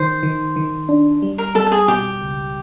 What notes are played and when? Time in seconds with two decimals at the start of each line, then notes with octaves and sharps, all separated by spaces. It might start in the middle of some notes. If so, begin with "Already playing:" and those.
Already playing: D#3 C5
0.23 D#3
0.56 D#3
0.89 D4
1.22 G3
1.38 A#4
1.55 G3 A4
1.67 A4
1.72 G#4
1.88 B2 G4
2.21 C#2